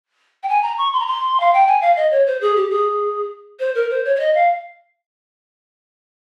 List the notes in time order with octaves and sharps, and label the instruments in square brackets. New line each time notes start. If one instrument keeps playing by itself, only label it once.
[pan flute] G5
G#5
A#5
C#6
C6
A#5
C6
F5
G5
G#5
F5
D#5
C#5
C5
G#4
G4
G#4
C5
A#4
C5
C#5
C#5
D#5
F5